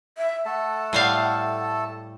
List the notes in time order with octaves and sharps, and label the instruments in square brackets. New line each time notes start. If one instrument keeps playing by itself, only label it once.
[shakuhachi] E5
[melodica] A3 A4 A5 [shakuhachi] F#5
[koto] A2 G3 F5